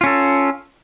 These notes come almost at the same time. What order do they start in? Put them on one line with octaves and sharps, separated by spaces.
F4 C#4 A4